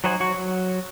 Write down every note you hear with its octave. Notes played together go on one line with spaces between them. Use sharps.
F#3 D#4 F#4 C5 G#5
F#3 F#4 C#6
F#3